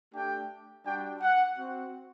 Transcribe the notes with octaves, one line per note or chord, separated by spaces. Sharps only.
A3 D4 G4 G5
G3 D4 F#4 G5
F#5
C4 F#4